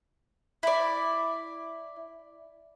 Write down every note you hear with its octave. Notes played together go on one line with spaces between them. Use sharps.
E4 D5